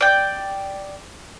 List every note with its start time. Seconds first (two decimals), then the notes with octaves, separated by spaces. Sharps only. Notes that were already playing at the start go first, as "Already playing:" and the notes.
0.01 D5 G5